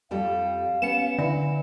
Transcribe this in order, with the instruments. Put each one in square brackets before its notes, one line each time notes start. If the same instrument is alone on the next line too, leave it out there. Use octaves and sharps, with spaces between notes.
[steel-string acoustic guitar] F2 G3 A4 [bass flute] F5
[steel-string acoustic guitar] B3 C#4 [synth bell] C#7 E7
[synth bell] D3 [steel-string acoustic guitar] E4